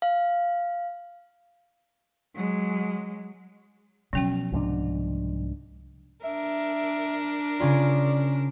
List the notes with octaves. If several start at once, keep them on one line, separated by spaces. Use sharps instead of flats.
F5
F#3 G#3
B2 F3 F#3 C#4 G5
C2 G#2 D4
D4 A#4 E5
C#3 C#4 F4 D5